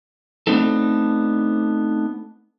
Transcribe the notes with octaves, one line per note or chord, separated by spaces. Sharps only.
A3 B3 C4 D4 D#4 A4